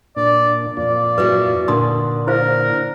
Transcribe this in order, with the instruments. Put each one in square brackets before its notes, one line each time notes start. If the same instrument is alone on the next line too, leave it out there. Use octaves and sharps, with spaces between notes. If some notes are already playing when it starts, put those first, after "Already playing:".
[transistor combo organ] A#2 D4 [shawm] D5
[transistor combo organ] F2 A#2 F4 [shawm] D5
[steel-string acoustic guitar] E4 F#4 G#4 [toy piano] B4
[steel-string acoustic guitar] A#2 D3 [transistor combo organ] D4 [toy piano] D#4 C6 D#6
[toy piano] E4 C5 F5 [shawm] A#4